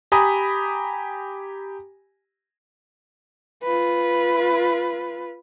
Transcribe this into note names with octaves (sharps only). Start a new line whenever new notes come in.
G4 G#5 A#5 B5 D#6
F4 B4